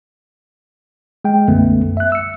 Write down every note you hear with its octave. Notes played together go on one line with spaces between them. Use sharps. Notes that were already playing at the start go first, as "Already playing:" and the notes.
G#3 G5
B1 F#2 D3 A3 B3
E5 F#6
E6 C#7